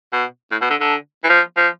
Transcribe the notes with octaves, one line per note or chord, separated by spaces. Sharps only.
B2
A2
B2
D3
D3
E3
F3
F3